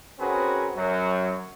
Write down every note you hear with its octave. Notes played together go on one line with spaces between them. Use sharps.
C4 C#4 F#4 G#4 A#4 B4
F#2 F#3